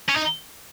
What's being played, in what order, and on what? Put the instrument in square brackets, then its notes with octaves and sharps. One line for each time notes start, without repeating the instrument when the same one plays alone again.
[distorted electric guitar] C#4
D#4